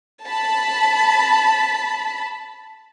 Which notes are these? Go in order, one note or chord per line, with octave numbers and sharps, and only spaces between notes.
A5 B5